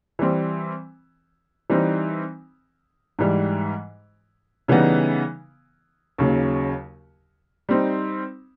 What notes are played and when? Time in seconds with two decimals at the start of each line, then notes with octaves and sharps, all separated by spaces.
0.19 E3 G3 C4
1.70 E3 G3 C4 D#4
3.19 G#2 E3 G3
4.68 C#3 E3 G3 B3 D#4
6.18 D#2 C#3 F#3
7.69 G3 C4 D#4